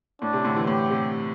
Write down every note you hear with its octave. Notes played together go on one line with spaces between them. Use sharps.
A2 D4
C3
A2 D3
C3 E3
A2 G4
C3